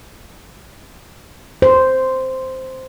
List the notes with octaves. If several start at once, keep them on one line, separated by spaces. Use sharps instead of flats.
C5